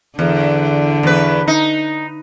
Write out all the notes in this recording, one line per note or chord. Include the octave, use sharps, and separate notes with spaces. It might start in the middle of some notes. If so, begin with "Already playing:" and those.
E2 D3
E2 B4
D#4